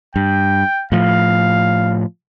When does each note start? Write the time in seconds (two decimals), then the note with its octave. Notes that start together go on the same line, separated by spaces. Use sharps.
0.16 G2 G5
0.92 A2 F3 F5